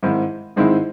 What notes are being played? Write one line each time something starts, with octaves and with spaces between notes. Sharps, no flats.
G#2 D#3 G#3 C4 E4
G#2 D#3 G#3 C4 E4